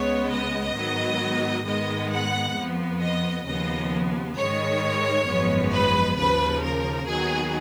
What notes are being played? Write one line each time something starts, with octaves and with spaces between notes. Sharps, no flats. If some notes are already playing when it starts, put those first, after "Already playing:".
Already playing: C#2 C#3 G#3 B3 C#5
D#5
G#2 D#3 F#3 B3
G#2 D#3 G#3 B3 D#5
F#5
F2 F3 B3
D#5
D#2 C#3 F3 B3 D#5
G#2 D#3 G#3 C#5
G#1 F#2 F3 G#3 B3
B4
D#2 C#3 F3 B4
A#4
D#2 D#3 F#3 B3 G#4